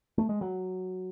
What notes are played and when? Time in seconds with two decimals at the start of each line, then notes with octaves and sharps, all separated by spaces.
0.18 A3
0.29 G#3
0.41 F#3